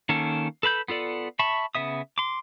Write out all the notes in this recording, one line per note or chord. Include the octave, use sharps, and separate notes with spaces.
D#3 A#3 C#4 A4
A4 B4 B5 G6
B3 F4 A4 D5
E5 A5 B5 C#6
C#3 B3 E5 D#6
C6 D6